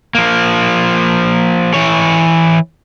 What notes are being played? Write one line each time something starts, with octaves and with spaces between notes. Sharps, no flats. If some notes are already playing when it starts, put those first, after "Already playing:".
F3 A#3
E3 C#5